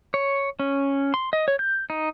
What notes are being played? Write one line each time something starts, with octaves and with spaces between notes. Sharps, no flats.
C#5
C#4
C6
D#5
C#5
G6
D#4